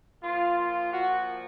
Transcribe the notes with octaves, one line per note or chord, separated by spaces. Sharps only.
A#2 F3 F4
F4
F#4